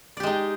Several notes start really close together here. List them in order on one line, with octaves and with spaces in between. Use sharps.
D5 G4 G#3 D#4